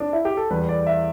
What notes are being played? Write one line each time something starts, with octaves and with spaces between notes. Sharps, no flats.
D4
E4
G4
A4
E2 E3 G3 B4
D5
E5